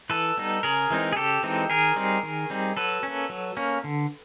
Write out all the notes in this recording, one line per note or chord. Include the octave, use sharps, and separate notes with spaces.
E3 A4 B4
G3 B3 D#4
C#3 G#4 A#4
E3 G#3 C4 D#4
G#4
C#3 G4 A4
E3 G#3 C4 D#4
D#3 G#4 A#4
G3 C4 D#4
D#3
G3 C4 D#4
F#3 A4 B4
A#3 C#4
F#3
A#3 C#4
D3